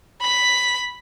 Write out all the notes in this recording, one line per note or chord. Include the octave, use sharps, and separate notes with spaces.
B5 B6